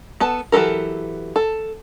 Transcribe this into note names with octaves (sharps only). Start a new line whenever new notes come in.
B3 A4 A5
E3 F#3 G4 A4 A#4
A4